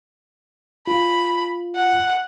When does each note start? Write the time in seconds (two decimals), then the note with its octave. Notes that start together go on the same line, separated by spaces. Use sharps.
0.87 F4 B5
1.75 F#5